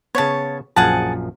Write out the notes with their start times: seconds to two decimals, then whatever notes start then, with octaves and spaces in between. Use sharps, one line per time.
0.15 C#3 B3 C#5 A5
0.76 A#1 F#2 F3 G#4 F#5 A5